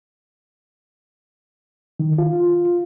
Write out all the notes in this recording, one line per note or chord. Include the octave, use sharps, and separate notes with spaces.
D#3
F4